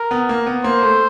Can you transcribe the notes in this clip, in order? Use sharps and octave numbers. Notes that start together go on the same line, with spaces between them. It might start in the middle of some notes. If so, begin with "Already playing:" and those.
Already playing: A#4
B3
A#3
B3
A#3 C5
A3